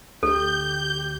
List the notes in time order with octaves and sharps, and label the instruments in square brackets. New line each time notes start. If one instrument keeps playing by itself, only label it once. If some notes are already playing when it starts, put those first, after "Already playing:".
[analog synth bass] D2 [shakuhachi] G4 [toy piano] A4 [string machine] G6